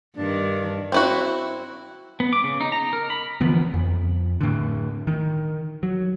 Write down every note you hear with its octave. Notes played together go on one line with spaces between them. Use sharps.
G2 D#3 D4
C4 E4 F#4
B3
D6
C#3
D#4
A#5
A#4
B5
D3 E3 F3 B3
F2
A2 D3
D#3
F#3